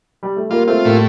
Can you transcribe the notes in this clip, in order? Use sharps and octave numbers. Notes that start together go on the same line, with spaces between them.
G3
A3
G3 A#3 F4
A3 C4 F4
A2 G3 A#3